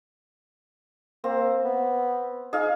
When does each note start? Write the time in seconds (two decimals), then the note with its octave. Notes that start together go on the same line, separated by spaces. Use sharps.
1.24 A#3 C4
1.65 B3
2.53 D#4 G#4 F5